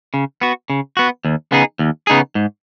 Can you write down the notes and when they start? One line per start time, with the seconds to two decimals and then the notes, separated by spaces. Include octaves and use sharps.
0.14 C#3
0.41 B3 F#4
0.70 C#3
0.97 B3 F#4
1.25 D#2
1.52 C#3 B3 D#4 G#4
1.79 D#2
2.07 C#3 B3 D#4 G#4
2.35 G#2